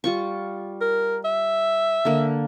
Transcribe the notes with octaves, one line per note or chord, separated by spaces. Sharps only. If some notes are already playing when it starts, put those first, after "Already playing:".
G3 F4 C#6
A#4
E5
D3 A#3